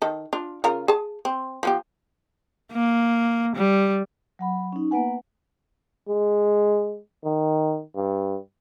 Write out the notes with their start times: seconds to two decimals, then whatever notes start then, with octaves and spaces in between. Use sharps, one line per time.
0.02 D#3 A4
0.33 D4 F4
0.64 C#3 F4 A#4
0.88 G#4 A5
1.25 C4
1.63 F3 B3 G4
2.73 A#3
3.56 G3
4.39 F#3 F#5 B5
4.72 C#4 D#4
4.91 A#3 B3 B4 F#5 G#5
6.09 G#3
7.25 D#3
7.96 G2